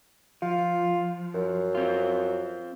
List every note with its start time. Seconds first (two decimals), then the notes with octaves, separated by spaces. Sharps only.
0.42 F3 F4
1.34 F#2
1.75 C4 F4